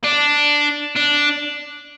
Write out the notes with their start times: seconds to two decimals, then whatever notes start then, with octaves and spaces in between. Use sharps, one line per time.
0.04 D4
0.96 D4